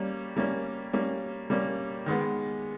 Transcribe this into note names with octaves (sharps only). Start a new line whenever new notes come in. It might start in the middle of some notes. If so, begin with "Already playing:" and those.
Already playing: G3 A#3 C#4
G3 A#3 C#4
G3 A#3 C#4
G3 A#3 C#4
D#3 G#3 B3